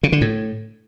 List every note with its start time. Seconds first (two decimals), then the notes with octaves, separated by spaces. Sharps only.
0.03 C#3
0.12 D3
0.21 A2